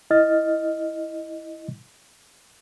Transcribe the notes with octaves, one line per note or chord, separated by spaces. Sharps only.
E4 D#5 F6 A6